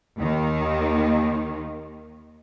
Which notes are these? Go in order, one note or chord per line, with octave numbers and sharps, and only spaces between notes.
D#2 D#3